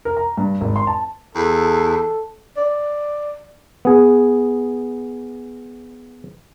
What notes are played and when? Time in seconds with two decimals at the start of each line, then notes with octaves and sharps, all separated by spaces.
0.05 A#4
0.17 A#5
0.37 G2
0.61 G#1
0.76 C6
0.87 A5
1.35 E2 A4
2.57 D5
3.85 B3 G#4